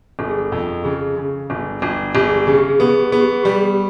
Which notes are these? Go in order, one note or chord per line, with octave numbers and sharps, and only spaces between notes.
G1 A4
G#4
A4
F2
C#3 G#4
C#3
G1
G1
G1 G4
G#4
G4
C#3 G#4
G4
G#4
B3 G4
G#4
G4
B3 G#4
G4
G#4
G3 G4
G#4
G4